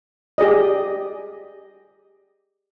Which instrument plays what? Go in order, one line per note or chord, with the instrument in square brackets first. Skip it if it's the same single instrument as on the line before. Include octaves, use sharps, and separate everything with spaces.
[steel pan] G4 G#4 D5 D#5